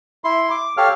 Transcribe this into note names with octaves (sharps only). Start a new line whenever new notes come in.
E4 C6
D6
G4 A4 C#5 F5 F6